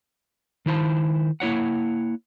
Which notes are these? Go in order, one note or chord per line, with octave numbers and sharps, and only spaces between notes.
D#3 E4 C5 A5
A#3 E4 C#5 F#5